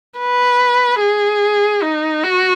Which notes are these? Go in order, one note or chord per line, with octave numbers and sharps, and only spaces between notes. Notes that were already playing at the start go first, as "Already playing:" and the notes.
B4
G#4
D#4
F#4